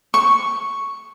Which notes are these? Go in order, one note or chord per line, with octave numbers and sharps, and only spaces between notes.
C#6